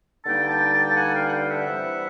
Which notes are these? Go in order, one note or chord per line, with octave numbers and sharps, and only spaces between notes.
G2 D3 G3 A#3 D#4 G5 A5
G5 A5
G5 A5
A5
F#5 G#5
F5 G5
F#5
F5 G5
E5 F#5
C3 E3 G3